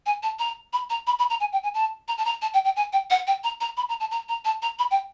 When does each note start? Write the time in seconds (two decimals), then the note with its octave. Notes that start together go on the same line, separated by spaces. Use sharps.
0.06 G#5
0.23 A5
0.39 A#5
0.73 B5
0.90 A#5
1.07 B5
1.19 B5
1.30 A#5
1.40 G#5
1.52 G5
1.63 G#5
1.74 A5
2.08 A#5
2.18 A5
2.25 A#5
2.42 A5
2.54 G5
2.65 G5
2.76 G#5
2.93 G5
3.10 F#5
3.27 G5
3.44 A#5
3.61 A#5
3.77 B5
3.89 A#5
4.00 A5
4.11 A#5
4.29 A#5
4.45 A5
4.62 A#5
4.79 B5
4.91 G5